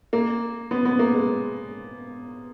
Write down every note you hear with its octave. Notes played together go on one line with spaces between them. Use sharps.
A#3
B3
B3
A#3
G#3